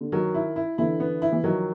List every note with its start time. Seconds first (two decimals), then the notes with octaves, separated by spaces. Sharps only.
0.01 D3
0.12 D#3 F#3
0.34 E4
0.56 E4
0.78 D3 E3 E4
1.00 B3
1.22 E4
1.32 E3
1.44 D#3 F3 F#3